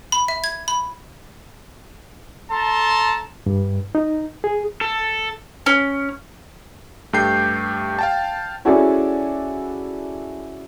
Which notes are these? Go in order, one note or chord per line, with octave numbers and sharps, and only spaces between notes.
B5
E5
G#6
B5
A4 A5 A#5 C6
G2
D#4
G#4
A4
C#4
G2 A3 G4 G5 G6 C7
F5 G5 A5
C#4 E4 F#4 G#4 A4 D5